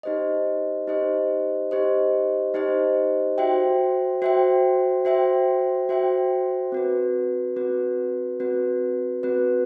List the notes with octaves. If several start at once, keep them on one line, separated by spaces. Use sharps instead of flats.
D#4 G4 C5 D#5
D#4 G4 C5 D#5
D#4 G4 C5 D#5
D#4 G4 C5 D#5
F#4 C5 E5 G5
F#4 C5 E5 G5
F#4 C5 E5 G5
F#4 C5 E5 G5
C4 F#4 B4
C4 F#4 B4
C4 F#4 B4
C4 F#4 B4